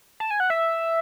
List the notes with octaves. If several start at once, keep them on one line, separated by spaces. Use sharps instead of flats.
A5
G#5
F#5
E5